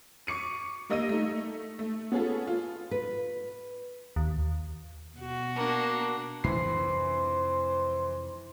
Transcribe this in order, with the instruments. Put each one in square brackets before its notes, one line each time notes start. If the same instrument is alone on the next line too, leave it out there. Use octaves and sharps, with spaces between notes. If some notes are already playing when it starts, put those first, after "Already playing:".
[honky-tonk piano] C#6 D6 C#7 D#7
G3 A#3 D#5 E6 A#6 D#7
A3 D#4
A3
B3 C#4 F4 G#4 A4
F4
[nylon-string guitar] B4
[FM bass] D#2
[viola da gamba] B2 F#4
[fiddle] A#3 D4
[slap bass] F2 C3 D4 [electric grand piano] E3 B5 C7 [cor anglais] C5